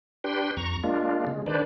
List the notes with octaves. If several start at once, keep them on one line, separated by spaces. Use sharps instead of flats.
D4 G4 B4 G5 C6
F2 A#5 C#6
G#3 A#3 D4 F4
C#3 G#3
D#3 D4 B4 C5 D5